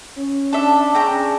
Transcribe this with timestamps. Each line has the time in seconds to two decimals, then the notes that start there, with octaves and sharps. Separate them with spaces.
0.16 C#4
0.53 D4 A4 E5
0.95 C#4 G#4 G5 A#5